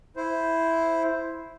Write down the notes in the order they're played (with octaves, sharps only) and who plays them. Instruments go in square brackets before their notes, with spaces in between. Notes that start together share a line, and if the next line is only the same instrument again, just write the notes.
[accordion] E4 C5